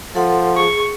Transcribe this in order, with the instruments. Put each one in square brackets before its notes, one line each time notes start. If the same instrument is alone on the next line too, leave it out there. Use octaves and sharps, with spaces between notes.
[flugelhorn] F3 [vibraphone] A4 F#5 C6
[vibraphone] G#4 [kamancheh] C#6